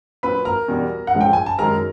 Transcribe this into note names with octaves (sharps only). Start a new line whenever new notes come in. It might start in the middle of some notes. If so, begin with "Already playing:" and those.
A#2 F#3 B4 B5
A#4 A#5
E2 B2 G3
F#5
A2 F3 G#3
G5
G#5
A5
F#2 D#3 G#3 A#4 A#5